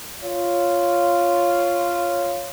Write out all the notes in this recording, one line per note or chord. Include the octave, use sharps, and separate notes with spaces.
F4 C#5